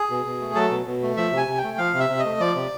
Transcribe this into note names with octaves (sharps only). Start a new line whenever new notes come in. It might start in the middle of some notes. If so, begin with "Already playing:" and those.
Already playing: G#4
B2
B2
A3
F#3 A4
B2
B2
A3
F3 E5
C3
G#5
C3
G5
A3
F3 F5
C3
E5
C3
D#5
A3
F3 D5
C3